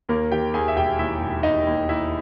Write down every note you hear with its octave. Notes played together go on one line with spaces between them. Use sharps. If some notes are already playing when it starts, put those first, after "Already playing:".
D#2 A#3 A#4
D#3 G4 G5
D#2 G#4 G#5
E5
E1 G4 G5
D#2 E4 E5
E1
E1 D#4 D#5
D#2
D#2 E4 E5